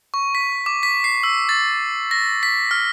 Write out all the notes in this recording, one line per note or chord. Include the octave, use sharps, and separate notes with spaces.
C#6
B6
D6
B6
C7
E6
A6
A#6
B6
F6